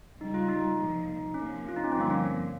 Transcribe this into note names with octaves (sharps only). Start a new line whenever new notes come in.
C#2 C#3 G3 D#4
F4
D#4
C2 A#2 F3
C3 F3 A#3 C#4
F4
D#4
C#4
G1 G2 F3 C4
A#3
C#4